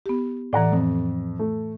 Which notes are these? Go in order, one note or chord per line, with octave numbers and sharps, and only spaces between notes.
B3 G4
A2 E3 D5 F#5 A#5
F2
A3